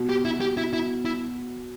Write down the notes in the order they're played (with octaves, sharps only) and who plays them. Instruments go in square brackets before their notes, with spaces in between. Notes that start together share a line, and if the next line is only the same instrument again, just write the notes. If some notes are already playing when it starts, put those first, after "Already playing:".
Already playing: [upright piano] B2
[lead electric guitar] G4
E4
G4
E4
E4
E4